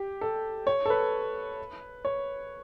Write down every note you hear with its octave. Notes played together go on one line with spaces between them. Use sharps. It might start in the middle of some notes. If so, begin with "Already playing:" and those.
Already playing: G4
A4
C#5
A4
B4
C#5